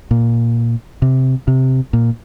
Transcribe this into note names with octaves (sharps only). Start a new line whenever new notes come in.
A#2
C3
C3
A#2